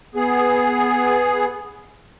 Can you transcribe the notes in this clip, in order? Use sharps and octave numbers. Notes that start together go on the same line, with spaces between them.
B3 G#4